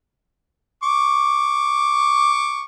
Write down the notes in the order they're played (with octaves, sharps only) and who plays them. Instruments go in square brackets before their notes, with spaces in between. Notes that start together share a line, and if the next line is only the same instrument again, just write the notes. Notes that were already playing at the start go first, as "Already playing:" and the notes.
[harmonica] C#6 D6